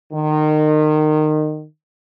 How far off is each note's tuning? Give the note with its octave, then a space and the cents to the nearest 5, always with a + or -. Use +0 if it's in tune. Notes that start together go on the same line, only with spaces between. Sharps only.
D#3 -25